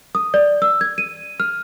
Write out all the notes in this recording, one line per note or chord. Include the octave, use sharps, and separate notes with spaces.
D#6
D5
E6
G#6
D#7
F6